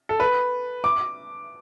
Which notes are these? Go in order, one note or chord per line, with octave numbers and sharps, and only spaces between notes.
A4
B4
D6